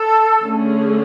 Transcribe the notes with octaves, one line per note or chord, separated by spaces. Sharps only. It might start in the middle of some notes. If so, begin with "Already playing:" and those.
Already playing: A4
D3 A3 C#4 G#4